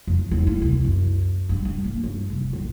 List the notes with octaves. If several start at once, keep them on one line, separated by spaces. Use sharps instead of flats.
F2
D#2
E4
C2
F#2
G2
G2
A#3
G2
F1
B1